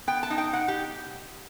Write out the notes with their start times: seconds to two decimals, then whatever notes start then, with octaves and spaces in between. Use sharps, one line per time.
0.07 B3 G5
0.23 A5
0.30 D#4
0.38 G5
0.53 B2 F#5
0.68 G4